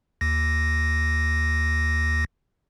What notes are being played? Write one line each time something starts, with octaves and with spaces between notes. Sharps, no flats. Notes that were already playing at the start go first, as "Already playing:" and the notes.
D#2 A#6